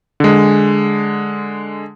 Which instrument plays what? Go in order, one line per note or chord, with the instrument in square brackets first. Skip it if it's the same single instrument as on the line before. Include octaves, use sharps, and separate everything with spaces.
[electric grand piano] D3 G#3